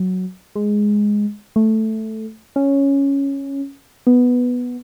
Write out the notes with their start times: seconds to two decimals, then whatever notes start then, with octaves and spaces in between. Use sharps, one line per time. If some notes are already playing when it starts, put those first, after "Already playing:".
Already playing: F#3
0.56 G#3
1.56 A3
2.56 C#4
4.07 B3